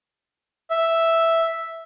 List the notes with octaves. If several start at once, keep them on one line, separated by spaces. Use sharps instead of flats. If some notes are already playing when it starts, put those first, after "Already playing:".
E5